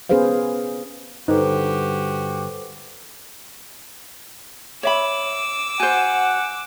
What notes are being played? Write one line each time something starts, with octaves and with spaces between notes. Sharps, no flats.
B3 C#4 G#4 B4 C5 F5
G2 D3 D#4 F#4 G4 A4 B4 C5
C#5 E5 B5 D6 E6
F#4 C5 F#5 G#5 G6